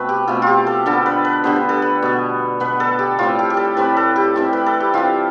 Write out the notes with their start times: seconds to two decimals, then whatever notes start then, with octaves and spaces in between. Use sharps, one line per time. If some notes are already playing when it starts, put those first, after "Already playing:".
Already playing: B2 A3 C4 B4
0.09 G4
0.28 B2 A3 C4 F4
0.42 F4 G4
0.67 A4
0.86 D3 G3 B3 A4
1.06 B4
1.25 B4
1.44 D3 G3 B3 C5
1.56 B4
1.69 A4
1.82 B4
2.02 B2 B3
2.60 B2 B3 B4
2.80 A4
2.99 G4
3.18 A2 G3 C4 F4
3.39 G4
3.50 G4
3.57 A4
3.77 A2 G3 C4 B4
3.97 A4
4.16 G4
4.36 E3 G3 C4
4.53 B4
4.66 A4
4.80 G4
4.93 E3 G3 C4 F4